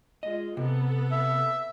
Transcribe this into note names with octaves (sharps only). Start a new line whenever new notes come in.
G#3 F4 D#5
C3 B3 A4
E5